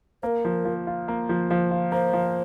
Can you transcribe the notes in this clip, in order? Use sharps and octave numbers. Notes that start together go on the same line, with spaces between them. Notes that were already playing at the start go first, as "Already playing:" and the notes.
A#3 A#4 C5
F3
F3
F4
A#3
F3
F3
F4
A#3 C5
F3